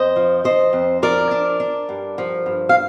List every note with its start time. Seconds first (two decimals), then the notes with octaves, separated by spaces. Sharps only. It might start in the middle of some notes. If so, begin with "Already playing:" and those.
Already playing: F2 C5 D#5
0.16 F3
0.44 F3 C5 D#5
0.73 F2
1.02 F3 A#4 D5
1.31 D4
1.60 D4
1.89 G2
2.18 F3
2.46 G2
2.69 F5